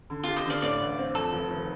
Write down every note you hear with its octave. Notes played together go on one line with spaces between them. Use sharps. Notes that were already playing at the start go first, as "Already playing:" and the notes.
D3
F4 G4
C5 D#5
D3 D5 F5
A2 D5 F5
A1
C4
F2 A4
F1
D#3